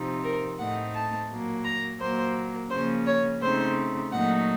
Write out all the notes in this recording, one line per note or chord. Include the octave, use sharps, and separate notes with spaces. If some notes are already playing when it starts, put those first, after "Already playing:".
Already playing: C3 F3 C4 D#4
A#4
A2 A3 C4 D#4 F#5
A5
A#2 F#3 A#3
A#5
A#2 F#3 A#3 C5
C#3 F3 A#3 C#4 C5
C#5
C#3 A3 C4 D#4 C5
A#2 F#3 A3 D#4 F#5